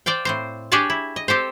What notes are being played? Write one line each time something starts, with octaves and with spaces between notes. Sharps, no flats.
C5 D5 F5 G5
A2 C4 C5
D4 G4 G#4 C#5 D5 A5
E4
D#5
C4 G4 A4 C5